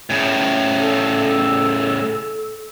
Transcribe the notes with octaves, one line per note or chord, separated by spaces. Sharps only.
A2 C#3
A4